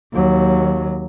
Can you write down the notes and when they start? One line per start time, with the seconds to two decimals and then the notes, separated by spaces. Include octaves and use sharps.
0.13 D#2 F#3